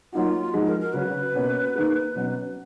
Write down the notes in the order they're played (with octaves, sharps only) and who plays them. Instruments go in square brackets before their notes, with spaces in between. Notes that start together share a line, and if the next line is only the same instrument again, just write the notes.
[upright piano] F#3 A#3 D#4 F#4 [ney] F4
[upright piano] F3 G#3 D#4 F#4
[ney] A#4
A#4
[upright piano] C#3 F#3 C#4 F#4 [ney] B4
[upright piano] B2 A#3 C#4 F#4
D#3 A#3 D#4 G#4
B2 F#3 C#4